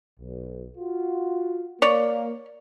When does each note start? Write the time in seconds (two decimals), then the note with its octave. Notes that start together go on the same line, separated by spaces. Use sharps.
0.20 B1
0.77 F4 F#4
1.82 A#3 C#5 D5